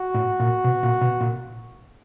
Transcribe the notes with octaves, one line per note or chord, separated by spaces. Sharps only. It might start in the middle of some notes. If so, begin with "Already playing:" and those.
Already playing: F#4
A2
A#2
B2
A#2
B2
A#2